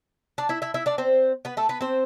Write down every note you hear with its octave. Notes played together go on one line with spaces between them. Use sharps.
D4 D5
E4 E5
E4 E5
E4 E5
D4 D5
C4 C5
B3 B4
A3 A4
B3 B4
C4 C5